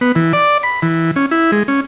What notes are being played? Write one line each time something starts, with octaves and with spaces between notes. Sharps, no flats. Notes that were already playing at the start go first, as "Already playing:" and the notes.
B3
E3
D5
B5
E3
C#4
E4
G#3
C#4